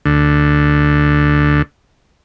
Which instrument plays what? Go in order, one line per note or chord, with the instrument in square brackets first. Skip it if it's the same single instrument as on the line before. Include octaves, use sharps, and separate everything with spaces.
[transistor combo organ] D2 D3